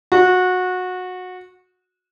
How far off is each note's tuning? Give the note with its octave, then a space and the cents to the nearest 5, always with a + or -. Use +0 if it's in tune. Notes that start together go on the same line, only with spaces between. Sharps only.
F#4 -20